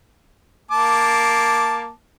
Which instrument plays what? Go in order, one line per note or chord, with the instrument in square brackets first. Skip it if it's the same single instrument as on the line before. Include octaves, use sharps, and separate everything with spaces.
[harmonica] A#3 A5 D6